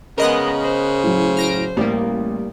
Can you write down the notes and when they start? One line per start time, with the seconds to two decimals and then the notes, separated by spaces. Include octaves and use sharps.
0.18 C#3 G#3 B3 A#4 D#5 F#6
0.62 C5
1.03 A2 F#3
1.37 F6 A#6 D7
1.77 A1 G3 A#3